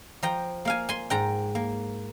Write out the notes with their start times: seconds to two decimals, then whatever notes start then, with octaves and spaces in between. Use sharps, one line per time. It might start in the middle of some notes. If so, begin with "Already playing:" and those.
0.23 F3 G5 A#5
0.65 A#3 F5 G#5
0.89 G#5 C6
1.10 G#2 G5 A#5
1.55 A#3